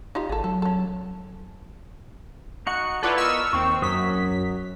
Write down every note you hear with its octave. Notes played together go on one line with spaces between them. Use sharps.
D#4 F4 G4
G#1 G#4 A4
F#3 A4
C#4 A4
D#4 F#4 F#5 C#7
E4 F4 A4 B4 D5 F#5
B3 A#4 D#5 C#6 E6 F6
D#2 C4 C#6
F#2 F#3 D#6 B6